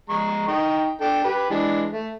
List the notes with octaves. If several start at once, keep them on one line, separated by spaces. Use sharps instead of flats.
G#3 A#5 C#6
D#4 G5 C#6
D4 A4 G5
G4 B4
E3 G#3 D4
A3